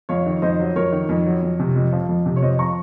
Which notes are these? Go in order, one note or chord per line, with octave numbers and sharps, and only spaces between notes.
F2 C#5 F5
D#3
F2 C5 D#5
F#3
F2 A#4 C#5
D#3
F2
F#3
F2
C3
F2
F3
F2
C3
C#5
F2 C5 D#5
F3 A#5 C#6